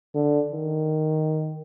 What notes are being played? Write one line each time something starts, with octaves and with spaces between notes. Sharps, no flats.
D3
D#3